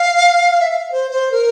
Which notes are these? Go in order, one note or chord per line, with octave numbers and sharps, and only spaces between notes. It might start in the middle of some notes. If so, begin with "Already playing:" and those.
Already playing: F5
E5
F5
C5
C5
A#4